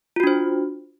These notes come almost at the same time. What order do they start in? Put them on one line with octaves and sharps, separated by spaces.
F4 F#4 D4 C5